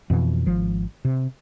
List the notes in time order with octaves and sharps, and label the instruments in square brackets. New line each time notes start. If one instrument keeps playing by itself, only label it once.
[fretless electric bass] F2 B2 E3
G#1 F3
C3